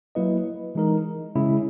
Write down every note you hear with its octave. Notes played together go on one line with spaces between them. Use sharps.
F#3 A#3 E4 B4 D#5
E3 G#3 D#4 A#4
C#3 G#3 C#4 E4 G#4